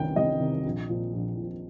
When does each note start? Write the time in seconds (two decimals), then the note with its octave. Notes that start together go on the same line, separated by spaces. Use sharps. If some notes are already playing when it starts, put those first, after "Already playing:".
Already playing: C2 C3 D#3 G5
0.16 C2 D#5
0.40 C3 D#3
0.65 A#1
0.89 A#2 F3
1.13 A#1
1.37 A#2 F3